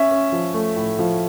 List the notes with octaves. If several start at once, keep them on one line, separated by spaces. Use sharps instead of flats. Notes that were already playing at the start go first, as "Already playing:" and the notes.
Already playing: C#4 E5
C#4
F3
A3
A2
F3